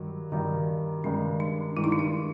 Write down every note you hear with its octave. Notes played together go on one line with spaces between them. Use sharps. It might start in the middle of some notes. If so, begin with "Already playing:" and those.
Already playing: G2 D#3 F#3
G2 D#3 F#3
G2 D#3 G#3 C#4
D4
G2 D#3 G#3 E4
D#4
D4
D#4